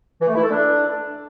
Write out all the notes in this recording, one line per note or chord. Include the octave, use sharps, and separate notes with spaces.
E3
A3
E4
A4
D4